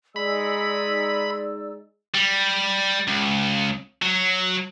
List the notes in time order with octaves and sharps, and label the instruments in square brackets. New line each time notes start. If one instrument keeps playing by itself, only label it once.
[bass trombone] G#3 [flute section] D#4 D5 E6 [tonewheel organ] B5
[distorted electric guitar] G3
C#2
F#3